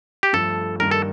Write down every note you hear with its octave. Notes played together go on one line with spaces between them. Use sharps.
G4
G2 F3 A3 A4
G2 D#3 G3 A#3 A#4
A4